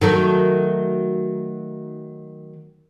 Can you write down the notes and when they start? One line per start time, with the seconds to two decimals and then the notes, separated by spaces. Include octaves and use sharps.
0.01 D#3 F#3 A3